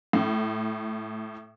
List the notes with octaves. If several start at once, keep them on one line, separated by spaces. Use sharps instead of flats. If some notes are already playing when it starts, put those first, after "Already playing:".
A2